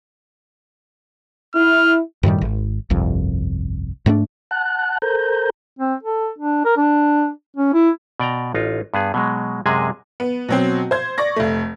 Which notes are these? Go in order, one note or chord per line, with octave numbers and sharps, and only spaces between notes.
E4 F6
F#2 A2 D#3 G3
G#1
G1 C2 F2
G#2 A3 B3 D4
F#5 A5 F#6
A4 A#4 C5 A#5 G6
C4
A4
D4
A#4
D4
C#4
E4
B2 D5 G5 A#5
A1 D#4 F4
G2 B3 G#4
B2 F#3 G#3
F#2 C3 G#3 G#4 D#5 G#5
B3
B2 F#3 C4
C5 G#6
D5 C#6 A#6
F1 A3